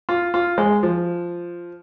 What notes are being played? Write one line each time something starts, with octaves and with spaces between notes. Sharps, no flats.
F4
F4
G#3
F3